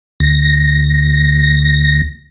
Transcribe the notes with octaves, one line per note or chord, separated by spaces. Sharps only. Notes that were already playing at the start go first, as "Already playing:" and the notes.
D2 A#6